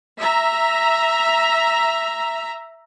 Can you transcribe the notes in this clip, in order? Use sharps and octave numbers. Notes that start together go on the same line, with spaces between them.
E5 A#5